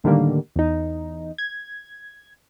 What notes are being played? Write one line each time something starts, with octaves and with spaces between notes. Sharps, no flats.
A2 D3 D#3 G3 A#3
E2 D#4
G#6